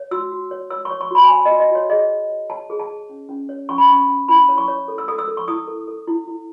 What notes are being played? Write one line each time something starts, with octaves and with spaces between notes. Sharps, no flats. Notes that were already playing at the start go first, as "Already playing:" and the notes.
Already playing: C#5
F#4 E6
F#4
C#5
C#5 E6
C#6
C#5
C#6
F#4 B5
G#5
C#5 A5
F#4 D#5
D#5
F#4 C#5
G#4 D#5
G#4
C#5
C#5 A5
G#4
A5
G#4
C#4
C#4
C#5
C#4 C#6
B5
C#4 C#6
C#4
E4 B5
C#5
C#6
C#5
A4
E6
A4 D#6
E6
A4
C#6
E4 D#6
A4
A4
E4
E4